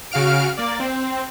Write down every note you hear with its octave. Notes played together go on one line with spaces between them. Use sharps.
C#3 F#4 F5 F6 D7
A#3 D5
C4